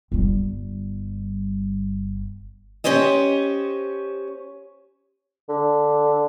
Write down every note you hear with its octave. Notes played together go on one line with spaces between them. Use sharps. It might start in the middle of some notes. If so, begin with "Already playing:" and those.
G1 G3
C#4 G4 C5 C#5 D#5
D3